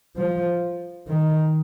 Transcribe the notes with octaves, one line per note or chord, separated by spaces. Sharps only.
F3
D#3